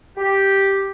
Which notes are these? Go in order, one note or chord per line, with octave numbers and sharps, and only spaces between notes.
G4